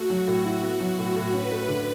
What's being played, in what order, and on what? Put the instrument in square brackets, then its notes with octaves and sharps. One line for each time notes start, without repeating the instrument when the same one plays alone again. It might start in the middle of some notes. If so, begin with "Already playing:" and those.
Already playing: [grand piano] A3 [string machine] F#4
[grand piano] F#3
A2
E4
B3
F#3
[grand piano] A2 [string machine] F#4
[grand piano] A2
[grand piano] C#4 [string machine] B4
[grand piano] A3
D3